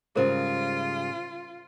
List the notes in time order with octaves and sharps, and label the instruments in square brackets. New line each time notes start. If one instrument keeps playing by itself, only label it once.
[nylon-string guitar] G#2 C#3 G3 [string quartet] F4 [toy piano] G#4 A#4 C5